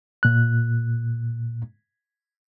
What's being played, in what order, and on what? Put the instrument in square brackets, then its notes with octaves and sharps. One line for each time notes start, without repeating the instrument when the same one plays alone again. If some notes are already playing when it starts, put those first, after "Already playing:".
[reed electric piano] A#2 F#6